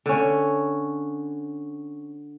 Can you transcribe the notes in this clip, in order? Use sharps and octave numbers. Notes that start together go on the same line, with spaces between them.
D3 C#4